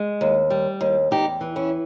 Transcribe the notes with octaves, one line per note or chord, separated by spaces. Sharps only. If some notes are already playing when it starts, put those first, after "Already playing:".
Already playing: G#3
D#2
G3
D#2
E2 D#4 G4
E3
C#4 E4